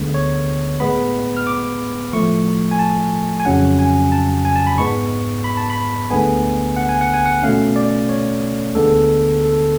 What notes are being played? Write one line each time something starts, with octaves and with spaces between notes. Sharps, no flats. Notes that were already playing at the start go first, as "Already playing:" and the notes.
Already playing: D2 D3 G#3 B3
C#5
A2 G#3 B3 B5
F6
D6
A2 F3 A3 C#6
G#5
A5
G#5
F2 C#3 F#3 C#4 F#5
G#5
A5
G#5
A5
B5
G#2 G#3 B3 C#6
B5
A5
B5
D2 D3 G#3 B3 G#5
F#5
G#5
F#5
G#5
F#5
B2 A3 C#4 F5
D5
C#5
D2 D3 G#3 B3 A4
A4